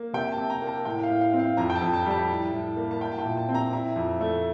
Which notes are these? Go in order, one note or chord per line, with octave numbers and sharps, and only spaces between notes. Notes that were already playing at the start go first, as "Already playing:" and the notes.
Already playing: A#3
C3 G5
A5
C3
A#5
A#3
A5
A2 G5
F5
A2
F5
C4
F5
F2 A#5
G5
A5
F2
A5
G3 A5
A2
A2
A#3
A5
E4 G5
A5
G5
A#2
A5
C4
A#5
E4 A#5
F2
A3